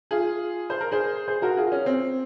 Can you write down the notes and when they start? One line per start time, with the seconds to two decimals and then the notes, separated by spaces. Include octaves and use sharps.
0.11 F4 G#4
0.70 C5
0.81 A#4
0.92 G#4 C5
1.28 G#4 C5
1.42 F#4 A#4
1.57 F4 G#4
1.72 C#4
1.86 C4